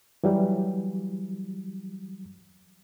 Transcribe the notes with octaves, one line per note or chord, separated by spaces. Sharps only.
E3 F#3 G3